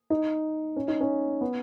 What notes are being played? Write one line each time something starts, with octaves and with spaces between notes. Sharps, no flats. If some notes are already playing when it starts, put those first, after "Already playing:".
D#4
C#4
D#4
C#4
B3